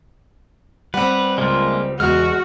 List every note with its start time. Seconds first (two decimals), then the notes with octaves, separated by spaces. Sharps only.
0.94 G3 C4 B4 F#5
1.38 C#2 G#3 A#3 F4
2.00 E2 G#3 F#4 F6